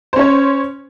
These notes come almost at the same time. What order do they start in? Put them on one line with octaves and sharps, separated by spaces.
C5 C#4 C#5